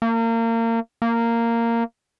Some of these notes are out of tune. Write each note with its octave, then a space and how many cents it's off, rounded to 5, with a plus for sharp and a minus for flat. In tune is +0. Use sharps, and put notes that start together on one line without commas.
A#3 -30
A#3 -10